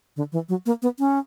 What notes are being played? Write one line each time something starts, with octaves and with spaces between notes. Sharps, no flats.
D3
E3
F#3
A#3
B3
C#4